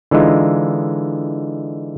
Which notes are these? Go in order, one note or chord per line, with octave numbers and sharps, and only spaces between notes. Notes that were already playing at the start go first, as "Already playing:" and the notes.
D3 E3 G#3 D#4 F4